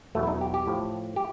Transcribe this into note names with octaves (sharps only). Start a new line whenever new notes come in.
E2 B2 F#3 A3
E4
D#4
G4
G4
A2 F3
G4